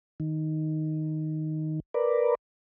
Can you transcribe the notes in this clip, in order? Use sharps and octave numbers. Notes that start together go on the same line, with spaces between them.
D#3
A#4 B4 D5